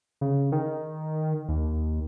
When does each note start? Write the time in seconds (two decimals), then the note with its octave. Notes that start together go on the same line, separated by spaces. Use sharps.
0.21 C#3
0.52 D#3
1.49 D#2